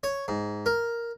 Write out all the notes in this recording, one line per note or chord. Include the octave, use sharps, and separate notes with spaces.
C#5
G#2
A#4